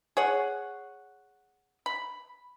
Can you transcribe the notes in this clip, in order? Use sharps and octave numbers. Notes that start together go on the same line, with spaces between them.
G#4 C#5 F#5
B5